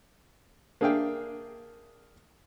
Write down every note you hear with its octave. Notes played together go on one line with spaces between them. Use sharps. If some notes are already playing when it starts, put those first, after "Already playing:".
A#3 D4 G#4 E5 F5 G5